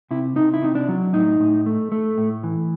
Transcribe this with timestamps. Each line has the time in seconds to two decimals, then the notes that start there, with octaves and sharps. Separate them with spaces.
0.11 C3 E4
0.36 C3 D#4
0.54 E4
0.62 C3 D#4
0.75 D4
0.89 F#3
1.14 A2 D#4
1.40 A2
1.66 A3
1.92 A3
2.18 A2
2.43 E3